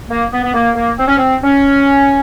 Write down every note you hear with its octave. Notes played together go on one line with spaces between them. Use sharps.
A#3
B3
B3
A#3
A#3
C4
C#4
C4
C#4